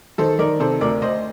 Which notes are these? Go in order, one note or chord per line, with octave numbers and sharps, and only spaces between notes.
D#3 A4 C5
D#3 A#4 D5
C3 A4 C5
D2 A#4 D5
D2 C5 D#5